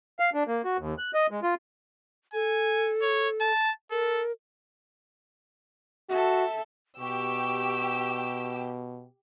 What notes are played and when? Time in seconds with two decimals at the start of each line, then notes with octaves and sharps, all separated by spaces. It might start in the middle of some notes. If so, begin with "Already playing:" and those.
0.19 F5
0.34 D4
0.47 A#3
0.65 F#4
0.78 D#2
0.98 F#6
1.14 D#5
1.31 G#3
1.43 F4
2.34 A4 G#5
3.02 C#5
3.41 A5
3.91 A4 A#4
6.10 F#4 A4 E5
6.99 B2 G4 C#6 E6